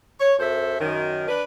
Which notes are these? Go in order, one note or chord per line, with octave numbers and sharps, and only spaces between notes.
C#5
F#2 A4 C5 E5
F#2 D#3
D4 B4